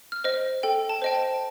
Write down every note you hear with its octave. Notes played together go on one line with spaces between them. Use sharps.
F6
C5 D#5
A4 G5
A5
C5 D#5 G5
A5